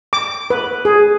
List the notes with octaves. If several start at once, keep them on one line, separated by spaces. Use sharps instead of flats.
D6
B4
G#4